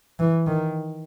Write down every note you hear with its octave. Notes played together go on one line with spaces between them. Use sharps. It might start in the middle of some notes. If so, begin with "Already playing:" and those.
E3
D#3